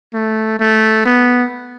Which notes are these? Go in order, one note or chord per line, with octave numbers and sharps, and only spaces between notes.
A3
A3
B3